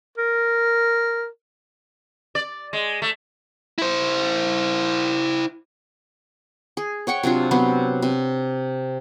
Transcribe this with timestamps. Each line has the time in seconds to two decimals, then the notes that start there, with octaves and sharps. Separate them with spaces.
0.18 A#4
2.35 D5
2.73 G#3
3.02 A3
3.78 E4 C5
6.77 G#4
7.07 C#5 F#5 G5 C#6
7.23 C3 F#3 D4 F4
7.51 C3 F#3 B3 C6
8.02 C3